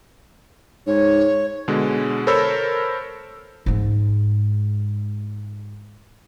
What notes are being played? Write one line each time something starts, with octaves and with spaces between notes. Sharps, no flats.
G#2 C#5
B2 D3 G#3
A4 A#4 C5 C#5 B5 E6
G#2 G#3